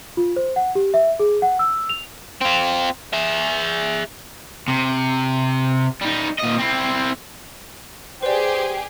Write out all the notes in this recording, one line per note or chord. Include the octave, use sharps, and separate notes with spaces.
F4
C5
F#5
G4
E5
G#4
F#5
E6
F7
C4 F4
G#4 E5
C3
G3 D#4
A#2 D#5
C4 E4
G4 G#4 B4 C5 D5